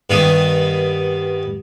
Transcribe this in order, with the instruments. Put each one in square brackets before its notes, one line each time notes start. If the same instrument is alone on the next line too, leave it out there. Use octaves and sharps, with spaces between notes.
[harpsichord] G2 D#3 B3 D#4